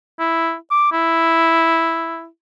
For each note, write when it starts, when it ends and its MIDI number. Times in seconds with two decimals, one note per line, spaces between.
0.20 0.55 64
0.71 0.89 86
0.93 2.27 64